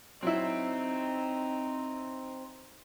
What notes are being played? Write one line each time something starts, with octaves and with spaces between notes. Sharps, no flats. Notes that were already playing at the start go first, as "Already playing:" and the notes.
F#3 C4 D#4 E4